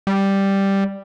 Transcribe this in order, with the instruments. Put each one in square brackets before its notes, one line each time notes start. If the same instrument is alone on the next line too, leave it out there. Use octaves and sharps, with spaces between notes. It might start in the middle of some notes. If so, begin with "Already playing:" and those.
[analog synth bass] G3